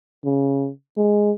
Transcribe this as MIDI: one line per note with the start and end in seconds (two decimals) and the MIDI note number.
0.25 0.69 49
0.97 1.32 56